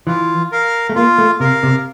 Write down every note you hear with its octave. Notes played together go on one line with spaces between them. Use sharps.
E3 F4
A#4 F5
A3
A#3 F4
A3
C3 A#4 F5
C3